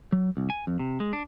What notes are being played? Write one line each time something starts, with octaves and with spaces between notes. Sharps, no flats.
F#3
C2
G#5
F2
C3
G#3
D4